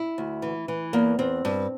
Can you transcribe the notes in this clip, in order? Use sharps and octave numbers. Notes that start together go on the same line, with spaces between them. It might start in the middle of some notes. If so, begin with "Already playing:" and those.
Already playing: E4
D2
E3
E3
E2 A#3
E2 C4
G2